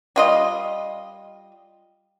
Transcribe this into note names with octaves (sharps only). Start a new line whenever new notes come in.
G3 F4 D#5